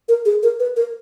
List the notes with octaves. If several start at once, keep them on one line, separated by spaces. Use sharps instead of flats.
A#4
G#4
A#4
B4
A#4